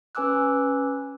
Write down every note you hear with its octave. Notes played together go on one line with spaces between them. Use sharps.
C#4 B4 G#5 D6 E6 F#6